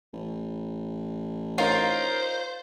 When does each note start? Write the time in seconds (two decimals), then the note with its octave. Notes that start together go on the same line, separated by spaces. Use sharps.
0.13 A1
1.58 D#4 F4 A#4 C5 C#5